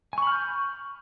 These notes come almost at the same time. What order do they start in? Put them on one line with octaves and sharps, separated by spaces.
G#5 C#6 B5 F6 G6